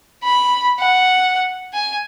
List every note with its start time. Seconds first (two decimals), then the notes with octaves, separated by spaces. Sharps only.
0.23 B5
0.79 F#5
1.73 G#5